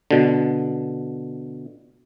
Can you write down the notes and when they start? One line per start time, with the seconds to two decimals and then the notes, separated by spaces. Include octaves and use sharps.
0.11 B2 D3